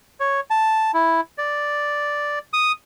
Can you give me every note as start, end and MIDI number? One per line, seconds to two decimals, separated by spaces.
0.20 0.40 73
0.50 0.91 81
0.94 1.21 64
1.38 2.39 74
2.53 2.72 87